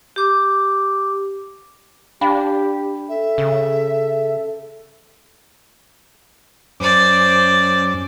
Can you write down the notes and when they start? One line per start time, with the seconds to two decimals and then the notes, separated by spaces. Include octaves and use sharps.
0.16 G4 D6
2.21 D4 G4 F5 G5 B5
3.09 A4 E5
3.38 C#3
6.80 F#2 C#4 C5 D5 D6